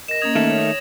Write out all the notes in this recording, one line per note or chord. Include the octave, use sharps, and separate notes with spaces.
A#4 D#5 A#6 E7
A#3 C#4 D#5 D#6 G#6 F7
D#3 A3 E7
C#5